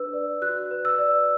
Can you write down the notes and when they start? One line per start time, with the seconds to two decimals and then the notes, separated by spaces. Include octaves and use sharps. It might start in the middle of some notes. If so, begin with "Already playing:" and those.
Already playing: D4 B4 E6
0.13 D5
0.42 F#4 F#6
0.71 B4
0.85 E6
0.99 D5